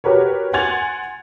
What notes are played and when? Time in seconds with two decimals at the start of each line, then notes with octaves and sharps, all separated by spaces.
0.04 F#4 G4 A#4 B4 C#5
0.53 F#5 G#5 C6 G#6 A6 F7